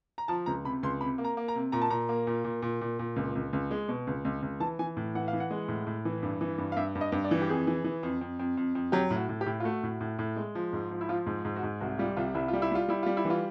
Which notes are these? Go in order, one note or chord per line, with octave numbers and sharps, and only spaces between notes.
A#5
F3 A5
C#2 A#5
C3 B5
C#2 C6
C3 B5
A#3
A#5
A#3
A#5
C3
A#2 A#5
A5
A#2 A#5
A#3
A#2
A#2
A#2
A#2
A#2
C#2
C#2
C#2
G#3
B2
C#2
C#2
C#2
E3 A5
E3 G#5
A2
E3 F#5
F5
E3
F#5
G#3
A2
A2
E3
G2
E3
G2
F5
G2 E5
G2
D#5
G2
D5
E3
G4
F2 G#4
E3
E3
F2
F2
F2
F2
F2
F#3 G4
A2
F#4
A2
G4
A2
F4
A3 F#4
A2
A2
A2
G#3
F3
G#2
F3
E4
F3 F4
G#2
G#2
F#4
G#2
C2 F#4
G3 F4
C2 F4
C2 E4
F4
G3
E4
G3 F4
G3 E4
G3 F4
E4
E3
F4